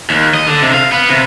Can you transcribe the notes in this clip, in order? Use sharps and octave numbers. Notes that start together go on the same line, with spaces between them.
D#2
D#5
D3
C3
F5
B3
C3